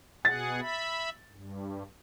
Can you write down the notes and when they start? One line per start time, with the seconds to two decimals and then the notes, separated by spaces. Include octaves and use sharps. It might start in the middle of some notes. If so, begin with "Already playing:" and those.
0.25 B2 G#4 F#5 A6
0.61 E5 B5
1.31 G2